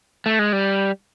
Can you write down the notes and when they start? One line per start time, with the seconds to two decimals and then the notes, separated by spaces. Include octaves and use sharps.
0.26 A3
0.39 G#3
0.53 G3